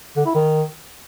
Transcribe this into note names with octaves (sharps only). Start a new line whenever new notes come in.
D3
E4
D#3